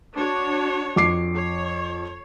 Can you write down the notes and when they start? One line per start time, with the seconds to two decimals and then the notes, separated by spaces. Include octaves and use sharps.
0.17 D4 F#4 C#5
0.96 F2 D6 C7
1.35 C#5